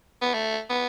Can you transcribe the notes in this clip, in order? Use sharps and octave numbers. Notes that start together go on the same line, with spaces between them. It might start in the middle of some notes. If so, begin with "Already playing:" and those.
B3
A3
B3